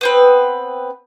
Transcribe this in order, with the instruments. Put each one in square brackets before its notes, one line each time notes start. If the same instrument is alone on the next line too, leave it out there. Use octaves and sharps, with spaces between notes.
[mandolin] B3 C4 B4